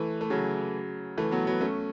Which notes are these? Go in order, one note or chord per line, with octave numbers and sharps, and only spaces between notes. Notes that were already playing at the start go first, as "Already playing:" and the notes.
Already playing: E3 A3
A3
C#3 F#3
E3 A3
F#3 B3
F#3 B3
A3 C#4